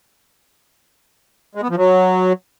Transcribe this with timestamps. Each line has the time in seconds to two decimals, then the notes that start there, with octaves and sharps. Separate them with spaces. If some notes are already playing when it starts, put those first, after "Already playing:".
1.55 G#3
1.62 B3
1.70 F3
1.77 F#3